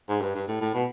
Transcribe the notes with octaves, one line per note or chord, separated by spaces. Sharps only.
G#2
G2
G2
A2
A2
B2